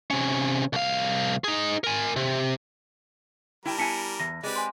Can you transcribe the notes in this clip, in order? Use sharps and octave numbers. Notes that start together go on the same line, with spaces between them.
C3 C#4
C2 F5
D#4 G#4
A#4 G#5
C3
G3 E4 A#4 G5 A5
B3 E4 G#5 A5 B6 C#7
E2 A#6
G#3 C4 G4 B4 D5
G#5 C6